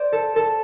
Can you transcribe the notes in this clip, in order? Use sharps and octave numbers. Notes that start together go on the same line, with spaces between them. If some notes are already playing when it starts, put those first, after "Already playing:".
Already playing: C5 D5
A4
A4